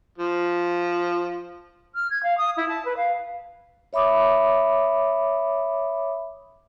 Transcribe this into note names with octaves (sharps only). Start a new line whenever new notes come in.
F3
F6
G#6
F5
D#6
E4
A5
B4
F5
C#5 E5 B5 D6 D#6